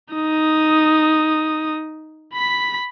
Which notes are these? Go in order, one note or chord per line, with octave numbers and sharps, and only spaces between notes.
D#4 D#6
B5 B6